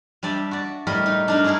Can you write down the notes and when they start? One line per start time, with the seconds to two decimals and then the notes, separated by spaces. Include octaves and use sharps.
0.23 G3 D4 D5 E5 G5
0.51 F#4 D5
0.87 A2 G3 A#4 D#5 B5
1.06 D#4
1.28 D4 D#4 A#4
1.44 C#4 D#4 E4 G#4 A#4